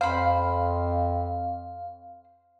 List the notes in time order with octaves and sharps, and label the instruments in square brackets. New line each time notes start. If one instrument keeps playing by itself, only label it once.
[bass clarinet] F2 [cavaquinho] C5 B5 [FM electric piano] F5